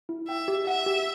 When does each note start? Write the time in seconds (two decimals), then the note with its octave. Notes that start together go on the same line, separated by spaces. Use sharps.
0.09 E4
0.28 E5 G5
0.48 G4
0.67 E5 F#5
0.86 G4